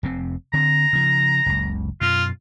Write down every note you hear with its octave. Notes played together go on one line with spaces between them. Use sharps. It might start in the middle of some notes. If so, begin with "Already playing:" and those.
F1 C3 C4
D3 C4 A#5
C#3 F3
F#1 C#2
F#2 B2 F4